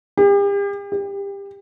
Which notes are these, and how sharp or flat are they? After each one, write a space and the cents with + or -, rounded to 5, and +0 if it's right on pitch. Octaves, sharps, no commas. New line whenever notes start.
G4 +40
G4 +25